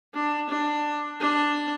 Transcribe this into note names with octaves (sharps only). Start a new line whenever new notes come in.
D4
D4
D4